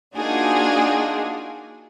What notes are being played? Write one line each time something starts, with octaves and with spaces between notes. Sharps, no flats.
A#3 D4 D#4 F4 F#4 G#4